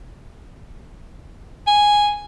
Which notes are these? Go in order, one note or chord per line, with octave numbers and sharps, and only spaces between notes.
G#5